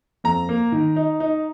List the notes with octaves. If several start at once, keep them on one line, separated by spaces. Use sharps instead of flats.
F2 A#5
A#3
D#3
D#4
D#4